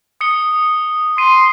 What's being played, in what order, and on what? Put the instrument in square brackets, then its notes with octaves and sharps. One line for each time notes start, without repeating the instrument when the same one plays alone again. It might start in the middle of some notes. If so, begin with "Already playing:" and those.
[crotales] D#6 C#7 G7
[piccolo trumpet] C6 [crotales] C7 D#7